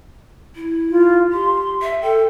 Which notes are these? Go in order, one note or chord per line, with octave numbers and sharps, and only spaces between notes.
E4
F4
G4 C6
E5
A4 G5